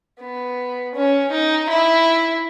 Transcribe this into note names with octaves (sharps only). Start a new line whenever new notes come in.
B3
C#4
D#4
E4